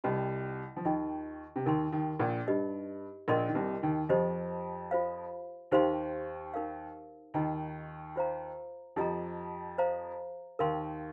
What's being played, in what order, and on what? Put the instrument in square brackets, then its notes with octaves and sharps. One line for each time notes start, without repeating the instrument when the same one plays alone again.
[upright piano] C2 C3 [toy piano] F4 D#5 G5 C6
[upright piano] F3
[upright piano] D#2 D#3 [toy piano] F4 D#5 G5
[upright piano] C3
[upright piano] D#2 D#3 [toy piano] A#4 G5 C6
[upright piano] D#2 D#3
A#1 A#2
[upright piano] G2 [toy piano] D#4 G4 D#5
[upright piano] A#1 A#2 [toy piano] A#4 D#5 C6
[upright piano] D#3
C2 C3
D#2 D#3
[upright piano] F2 F3 [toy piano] G4 C5 D#5
[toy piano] F4 C5 F5
[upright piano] D#2 D#3 [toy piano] G4 C5 F5 C6
[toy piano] D#4 A#4 F5
[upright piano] D#2 D#3 [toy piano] F4 D#5 A#5
[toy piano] F4 C5 F5 A#5
[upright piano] F2 F3 [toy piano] G4 D#5 A#5
[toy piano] C5 F5 A#5
[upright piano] D#2 D#3 [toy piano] A#4 F5 C6